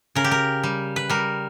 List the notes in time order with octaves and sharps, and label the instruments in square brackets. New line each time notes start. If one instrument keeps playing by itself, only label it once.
[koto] C#3 A#4
G4
A#4
G3
B4
G3 A#4